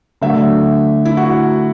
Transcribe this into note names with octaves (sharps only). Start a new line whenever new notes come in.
D3 F#3 A3 E5
E4
F#4